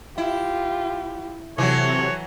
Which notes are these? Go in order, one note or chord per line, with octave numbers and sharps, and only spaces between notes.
E4 F4 G4
C3 E3 F#3 F#4 A4 C#5